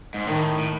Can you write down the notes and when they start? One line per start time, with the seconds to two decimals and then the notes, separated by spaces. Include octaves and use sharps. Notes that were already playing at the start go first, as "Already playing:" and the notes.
0.14 G#2
0.27 A2 D#3
0.58 A2